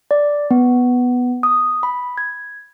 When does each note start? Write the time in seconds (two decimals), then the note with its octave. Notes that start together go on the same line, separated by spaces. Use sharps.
0.11 D5
0.51 B3
1.43 D#6
1.83 B5
2.18 G#6